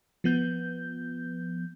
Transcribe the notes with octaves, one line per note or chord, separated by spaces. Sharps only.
F3 B3 G6